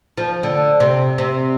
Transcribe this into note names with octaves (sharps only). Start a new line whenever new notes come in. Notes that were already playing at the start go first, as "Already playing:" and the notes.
F3
D3
C3
C3